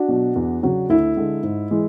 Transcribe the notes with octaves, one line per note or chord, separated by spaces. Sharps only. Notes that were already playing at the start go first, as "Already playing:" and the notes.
Already playing: D4 F#4
B2 F#3
E2
C#3 F#3
D2 E4
D3 G#3
G#2
E3 G#3